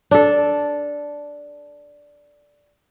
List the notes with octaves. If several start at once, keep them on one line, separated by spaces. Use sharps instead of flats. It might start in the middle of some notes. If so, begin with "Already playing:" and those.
D4 A4